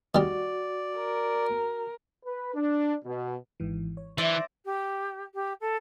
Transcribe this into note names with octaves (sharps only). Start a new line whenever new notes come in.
D#3 G3 F#4 D5
A#4
B4
D4
B2
G#1 G#2 E3
C#5
E3 C5 D5 E5 C6 A#6
G4
G4
A4